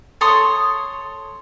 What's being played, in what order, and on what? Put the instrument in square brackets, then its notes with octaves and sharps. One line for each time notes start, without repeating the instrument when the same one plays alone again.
[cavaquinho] A4 C#5 C6 D#6